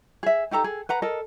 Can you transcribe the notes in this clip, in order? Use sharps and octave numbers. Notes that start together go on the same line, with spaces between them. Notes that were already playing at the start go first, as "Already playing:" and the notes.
G#4 E5
D#4 G4 A4 A#5
G#4 A4
B4 F#5 A#5
A4 A#4 D#5